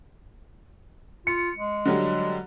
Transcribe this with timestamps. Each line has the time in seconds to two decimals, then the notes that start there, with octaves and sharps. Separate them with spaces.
1.27 F4 C#7
1.57 G#3
1.85 D3 F#3 G3